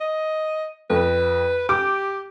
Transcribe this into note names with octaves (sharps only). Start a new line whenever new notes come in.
D#5
F2 B4
G4 D6